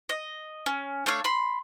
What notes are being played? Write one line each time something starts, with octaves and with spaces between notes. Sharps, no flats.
D#5
C#4
A3 D4 C#5 F5
B5 C6